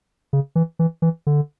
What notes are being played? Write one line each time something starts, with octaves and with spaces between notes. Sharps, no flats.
C#3
E3
E3
E3
D3